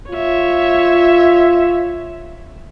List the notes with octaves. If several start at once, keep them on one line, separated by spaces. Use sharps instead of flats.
F4 C#5 E5